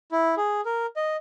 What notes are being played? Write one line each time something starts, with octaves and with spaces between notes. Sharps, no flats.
E4
G#4
A#4
D#5